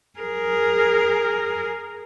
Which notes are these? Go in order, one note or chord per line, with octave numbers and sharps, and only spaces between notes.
G#4 A#4